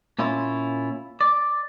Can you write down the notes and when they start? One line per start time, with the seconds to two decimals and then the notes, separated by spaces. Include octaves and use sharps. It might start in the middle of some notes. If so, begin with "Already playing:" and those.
0.19 A#2 C#4 E4 F4
1.21 D5